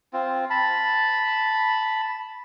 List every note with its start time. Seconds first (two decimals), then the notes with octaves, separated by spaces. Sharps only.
0.13 C4 F4
0.50 A5 B5